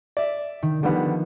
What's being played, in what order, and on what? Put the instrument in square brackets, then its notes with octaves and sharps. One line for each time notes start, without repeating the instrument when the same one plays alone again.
[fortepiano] D5 E5
[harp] D#3
[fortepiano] D3 G3 B3 [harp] D#3 F3